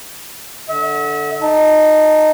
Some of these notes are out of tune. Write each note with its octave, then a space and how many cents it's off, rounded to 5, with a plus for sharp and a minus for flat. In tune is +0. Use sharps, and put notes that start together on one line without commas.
D3 +0 E5 -40
D#4 -10 A5 +0